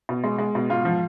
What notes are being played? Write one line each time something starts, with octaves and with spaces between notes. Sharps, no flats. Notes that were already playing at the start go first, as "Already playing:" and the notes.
B2
G#3
G#3
B2
G#2 F4
F3